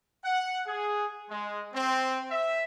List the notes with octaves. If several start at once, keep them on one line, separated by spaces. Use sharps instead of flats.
F#5
G#4
G#3
C4
E5